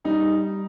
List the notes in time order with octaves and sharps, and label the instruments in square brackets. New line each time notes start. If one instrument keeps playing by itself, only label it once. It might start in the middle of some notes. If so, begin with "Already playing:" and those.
[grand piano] G3 D#4